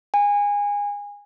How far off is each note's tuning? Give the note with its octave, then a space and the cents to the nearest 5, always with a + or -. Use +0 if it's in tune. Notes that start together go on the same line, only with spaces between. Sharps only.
G#5 -25